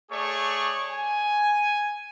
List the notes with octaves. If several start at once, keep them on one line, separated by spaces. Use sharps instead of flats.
A3 G#4 C#5 D5 C#6
G#5